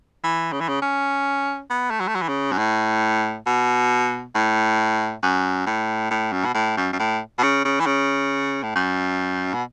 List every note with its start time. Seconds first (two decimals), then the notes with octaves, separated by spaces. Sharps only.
0.24 E3
0.53 C#3
0.61 E3
0.69 C#3
0.82 C#4
1.70 B3
1.90 A3
2.00 F#3
2.08 A3
2.15 F#3
2.22 E3
2.28 C#3
2.52 F#2
2.58 A2
3.46 B2
4.35 A2
5.23 F#2
5.66 A2
6.11 A2
6.32 F#2
6.45 B2
6.54 A2
6.77 F#2
6.93 F#2
6.99 A2
7.38 B2
7.43 C#3
7.65 C#3
7.80 E3
7.86 C#3
8.63 A2
8.75 F#2
9.54 B2